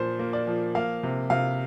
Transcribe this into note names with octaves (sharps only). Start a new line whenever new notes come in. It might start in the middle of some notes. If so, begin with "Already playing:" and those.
Already playing: A#2 F3 C5
A#3
D5
F3
A#3 F5
C3
C3 F5